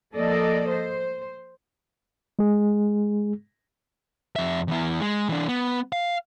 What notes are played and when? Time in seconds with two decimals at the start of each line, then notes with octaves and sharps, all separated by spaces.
0.14 F3 A#3 A4 D5 D#5
0.68 C5
2.39 G#3 G#4
4.36 F2 E5
4.68 E2 E4
5.01 G#3
5.29 E3 D4
5.49 B3
5.92 F5